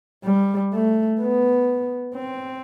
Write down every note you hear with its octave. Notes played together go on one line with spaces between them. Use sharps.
G3
A3
B3
C4